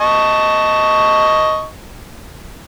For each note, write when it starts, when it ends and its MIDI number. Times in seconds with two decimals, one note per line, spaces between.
0.01 1.66 75
0.01 1.66 81
0.01 1.66 85